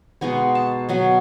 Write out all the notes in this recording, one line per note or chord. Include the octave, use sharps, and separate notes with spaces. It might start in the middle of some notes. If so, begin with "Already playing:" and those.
B2 G#3 B3 D#4 C#6
A5
B2 F#3 B3